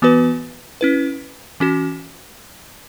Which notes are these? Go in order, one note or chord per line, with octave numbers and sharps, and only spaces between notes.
E3 B3 F#4 B4
C#4 E4 B4
E3 C#4 F#4